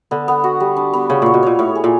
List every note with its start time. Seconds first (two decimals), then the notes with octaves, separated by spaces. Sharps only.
0.11 D3 B3
0.28 B3
0.44 F#4
0.60 G3
0.77 D4
0.93 B3
1.10 C#3 C#5
1.22 A#2 C#5
1.34 B2
1.43 A#2 C#5
1.59 A2 C#5
1.75 G#4
1.84 A#2